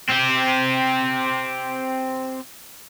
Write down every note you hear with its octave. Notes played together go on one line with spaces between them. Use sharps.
C4 G4